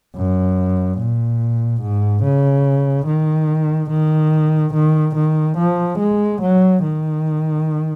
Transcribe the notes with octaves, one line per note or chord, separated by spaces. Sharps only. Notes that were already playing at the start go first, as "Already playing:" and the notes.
F#2
A#2
G#2
C#3
D#3
D#3
D#3
D#3
F3
G#3
F#3
D#3